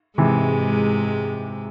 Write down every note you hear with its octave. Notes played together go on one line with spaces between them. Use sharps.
G#2 C3 E3 G#3